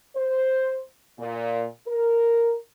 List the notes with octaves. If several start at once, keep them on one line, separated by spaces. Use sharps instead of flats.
C5
A#2
A#4